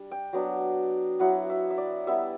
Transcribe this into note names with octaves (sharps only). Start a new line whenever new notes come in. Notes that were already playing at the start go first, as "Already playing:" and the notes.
Already playing: G3 D4
G5
F#3 B3 D4
F#3 B3 E4 F#5
E5
E5
D5
G3 B3 E4 E5